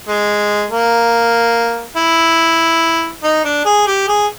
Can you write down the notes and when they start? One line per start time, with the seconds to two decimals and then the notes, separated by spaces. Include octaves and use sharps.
0.08 G#3
0.71 A#3
1.96 E4
3.23 D#4
3.45 D4
3.65 G#4
3.87 G4
4.08 G#4